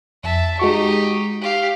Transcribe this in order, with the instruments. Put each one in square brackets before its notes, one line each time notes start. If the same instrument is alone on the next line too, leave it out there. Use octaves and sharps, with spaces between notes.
[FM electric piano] F2 [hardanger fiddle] E5 A5
[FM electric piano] G#3 F#4 C#6 [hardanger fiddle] D#4 G4
[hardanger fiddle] G4 F5